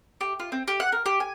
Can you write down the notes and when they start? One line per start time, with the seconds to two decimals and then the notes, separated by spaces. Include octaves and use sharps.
0.21 G4
0.40 F4
0.52 C4
0.68 G4
0.80 F#5
0.92 A#4
1.06 G4
1.20 G#5